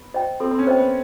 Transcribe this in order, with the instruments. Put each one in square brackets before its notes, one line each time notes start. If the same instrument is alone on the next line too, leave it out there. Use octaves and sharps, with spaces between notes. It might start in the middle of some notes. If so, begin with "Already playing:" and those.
Already playing: [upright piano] B3
[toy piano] C5 D#5 G5
[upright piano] C4 [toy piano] A4
[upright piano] C4
C#4
[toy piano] C5 D#5 G5
[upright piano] B3